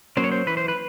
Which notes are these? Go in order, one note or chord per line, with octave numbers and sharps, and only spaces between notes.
F#3 A#3 C#4 C5
C#5
C5
E3 B4
C5
B4